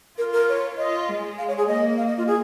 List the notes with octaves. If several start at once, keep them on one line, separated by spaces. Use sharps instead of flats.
F4 A#4
A#4
C#5
F4 D#5
G#3
F5
C#5
G#4
A#3 D#5
F5
D#5
F4
G#4